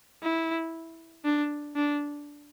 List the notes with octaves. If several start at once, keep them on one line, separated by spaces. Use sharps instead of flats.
E4
D4
D4